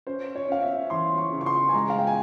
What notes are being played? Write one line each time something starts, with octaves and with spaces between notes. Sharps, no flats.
C#4 C5
C#5
C#4 F5
E5
E3 C6
C#6
C#3
C#6
C6
G#5
G#3 A#5
F5
G5
G#5